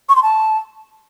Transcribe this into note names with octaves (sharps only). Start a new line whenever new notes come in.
C#6
C6
A5